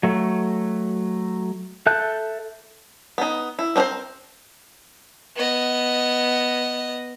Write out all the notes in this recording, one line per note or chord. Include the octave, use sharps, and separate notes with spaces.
F#3 A3
A4 E5 A5 F#6 G6
B3 D#4
E4
C4 D4 F#4 A#4 C5
B3 D#5